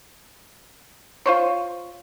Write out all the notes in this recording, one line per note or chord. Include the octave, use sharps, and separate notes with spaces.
F4 C5 C#5